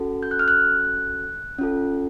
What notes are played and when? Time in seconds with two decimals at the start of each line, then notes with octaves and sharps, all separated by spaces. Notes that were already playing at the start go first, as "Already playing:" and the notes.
Already playing: C#4 F#4 A4
0.23 G6
0.31 F#6
0.39 F6
0.48 F#6
1.58 C#4 F4 A4